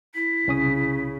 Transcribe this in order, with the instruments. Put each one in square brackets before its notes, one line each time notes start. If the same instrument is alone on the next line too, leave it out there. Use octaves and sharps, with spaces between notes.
[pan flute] E4 [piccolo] B6
[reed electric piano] C2 C#4 D#6 [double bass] C#3